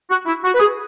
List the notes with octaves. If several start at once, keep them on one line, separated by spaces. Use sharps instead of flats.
F#4
E4
F#4
B4
G#4